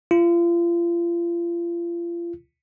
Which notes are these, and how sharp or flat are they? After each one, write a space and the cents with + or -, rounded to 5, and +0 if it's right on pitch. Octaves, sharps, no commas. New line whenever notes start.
F4 -35